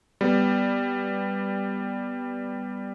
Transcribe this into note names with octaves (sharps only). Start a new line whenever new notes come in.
G3 B3